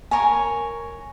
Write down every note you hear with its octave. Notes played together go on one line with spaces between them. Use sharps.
A#4 C#5 G#5